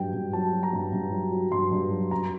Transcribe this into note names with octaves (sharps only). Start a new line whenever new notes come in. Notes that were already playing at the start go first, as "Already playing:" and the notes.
Already playing: G2 F#3 G5
G2
F#3 A5
F#3
A#5
G2
G2
F#3
F#3
G2 C6
G2
F#3
F#2 A#5